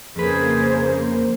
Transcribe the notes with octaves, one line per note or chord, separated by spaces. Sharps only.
F2 C#3 A#3 G#4 B4 C5